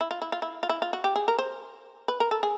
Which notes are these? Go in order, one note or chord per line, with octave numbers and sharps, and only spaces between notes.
E4
F4
E4
F4
E4
F4
E4
F4
F#4
G4
G#4
A#4
C5
B4
A#4
A4
G#4